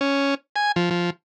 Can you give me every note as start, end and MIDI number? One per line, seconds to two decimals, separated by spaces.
0.01 0.35 61
0.56 0.72 80
0.76 0.90 53
0.91 1.10 53